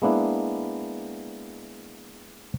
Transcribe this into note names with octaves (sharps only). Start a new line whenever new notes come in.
G#3 A#3 B3 D4 E4